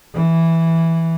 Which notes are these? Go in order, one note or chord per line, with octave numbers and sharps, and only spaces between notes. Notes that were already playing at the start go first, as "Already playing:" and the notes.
E3